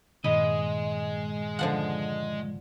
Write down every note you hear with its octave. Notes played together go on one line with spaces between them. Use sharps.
G2 A#2 D#3 G#3 D#5 B5
D3 F3 F#5